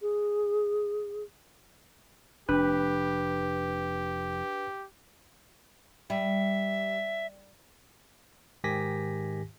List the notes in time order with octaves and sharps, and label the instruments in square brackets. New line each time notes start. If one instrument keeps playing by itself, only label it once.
[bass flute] G#4
[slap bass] F1 [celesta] D4 [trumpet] G4 [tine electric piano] B4
[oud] G3 [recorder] E5
[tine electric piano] G#2 D#3 G4 G#5 A#6 B6